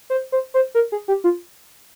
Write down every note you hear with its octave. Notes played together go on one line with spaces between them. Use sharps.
C5
C5
C5
A#4
G#4
G4
F4